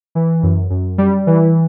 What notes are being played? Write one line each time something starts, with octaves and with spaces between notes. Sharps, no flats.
E3
F#2
F#2
G3
E3